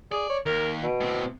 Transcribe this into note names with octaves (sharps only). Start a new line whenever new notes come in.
G#4 D5
C#5
D#2 A#4
B2
A2 C4